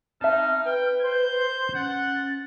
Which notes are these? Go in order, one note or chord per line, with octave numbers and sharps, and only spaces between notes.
C4 D#4 E5 A5 F6
B4 G5
C5 G6
C#4 F#5 A6